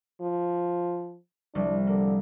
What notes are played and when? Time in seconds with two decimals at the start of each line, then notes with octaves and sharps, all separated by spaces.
0.22 F3
1.55 C2 F3 G3 D4
1.87 D3 A#3